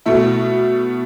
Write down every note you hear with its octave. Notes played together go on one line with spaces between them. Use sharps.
B2 A3 E4